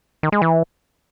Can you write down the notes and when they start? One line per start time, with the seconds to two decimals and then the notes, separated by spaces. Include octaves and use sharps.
0.23 D#3
0.32 G#3
0.42 E3